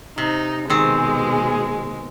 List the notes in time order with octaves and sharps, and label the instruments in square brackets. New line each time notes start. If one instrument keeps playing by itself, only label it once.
[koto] C3 [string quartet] D#4
[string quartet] B2 G#3 [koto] D#3 C4 [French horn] G#4